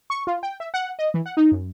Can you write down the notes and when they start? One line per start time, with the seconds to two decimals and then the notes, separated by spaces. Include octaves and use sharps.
0.10 C#6
0.27 F4
0.43 G5
0.60 E5
0.74 F#5
0.99 D#5
1.14 E3
1.26 F#5
1.37 D#4
1.52 F#2